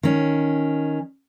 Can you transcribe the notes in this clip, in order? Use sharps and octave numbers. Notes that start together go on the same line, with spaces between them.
D#3 C#4